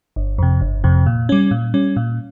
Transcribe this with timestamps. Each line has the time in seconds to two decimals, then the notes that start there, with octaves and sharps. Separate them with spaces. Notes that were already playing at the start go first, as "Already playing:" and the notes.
0.16 G1
0.38 F2 C3
0.61 G1
0.84 F2 C3
1.06 A#2
1.29 G3 C#4
1.51 A#2
1.74 G3 C#4
1.96 A#2